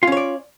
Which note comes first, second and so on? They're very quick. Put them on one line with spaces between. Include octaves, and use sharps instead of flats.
F4 C#4 C#5 D5